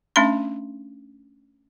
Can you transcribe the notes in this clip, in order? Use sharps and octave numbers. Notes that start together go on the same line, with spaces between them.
A3 C#4 D4 E5 B5 C6